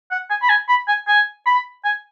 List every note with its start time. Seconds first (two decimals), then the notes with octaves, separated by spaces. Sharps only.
0.11 F#5
0.30 G#5
0.42 B5
0.49 G#5
0.69 B5
0.88 G#5
1.08 G#5
1.46 B5
1.85 G#5